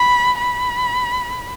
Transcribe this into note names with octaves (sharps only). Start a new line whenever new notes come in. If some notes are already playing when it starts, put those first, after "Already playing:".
Already playing: B5
B5